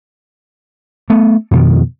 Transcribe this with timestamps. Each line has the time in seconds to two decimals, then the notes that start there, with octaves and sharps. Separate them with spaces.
1.10 A3 B3
1.51 F2 B2 D#3